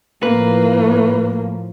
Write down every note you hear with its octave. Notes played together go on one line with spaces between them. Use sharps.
A2 F3 A#3 B4